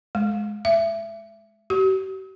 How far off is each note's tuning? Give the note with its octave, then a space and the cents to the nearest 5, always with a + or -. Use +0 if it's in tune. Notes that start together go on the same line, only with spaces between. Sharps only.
G#3 +20
E5 +20
G4 -45